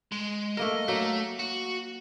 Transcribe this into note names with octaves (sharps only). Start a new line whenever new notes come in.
G#3
A3 A#3 A#4 D#5
F#3 A3 A#3
F#4